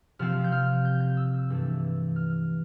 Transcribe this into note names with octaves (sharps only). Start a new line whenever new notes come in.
C3 F3 C4 F6
G6
F6
G6
G6
E6
G2 E3 A3
F6